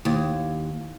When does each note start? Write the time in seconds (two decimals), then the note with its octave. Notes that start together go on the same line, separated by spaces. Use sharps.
0.05 D#2